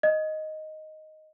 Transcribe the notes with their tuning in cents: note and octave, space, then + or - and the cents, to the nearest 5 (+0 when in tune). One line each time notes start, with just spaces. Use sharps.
D#5 +0